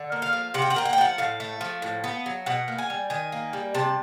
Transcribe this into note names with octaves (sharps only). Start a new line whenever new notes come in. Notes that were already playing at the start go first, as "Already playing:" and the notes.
Already playing: D3
A#3
F5
F3
C3 F#5
G5
F#5
A#3 G5
F#5
G5
F3 F#5
A2 F5
A3
F3
A2
B3
F#3
B2 F#5
A#3
G#5
G3
D#3 G#5
A#3
G3
C3 A5